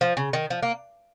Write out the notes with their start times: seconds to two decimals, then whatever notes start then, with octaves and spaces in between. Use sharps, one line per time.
0.01 F3
0.17 C#3
0.33 D#3
0.50 F3
0.62 A#3